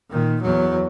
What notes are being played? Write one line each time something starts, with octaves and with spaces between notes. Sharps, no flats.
A#2 D#3
E2 F#3